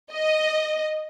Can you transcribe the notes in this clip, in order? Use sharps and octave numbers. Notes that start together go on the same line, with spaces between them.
D#5